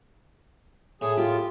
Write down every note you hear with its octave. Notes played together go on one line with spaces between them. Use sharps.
A2 G#4
F4 G4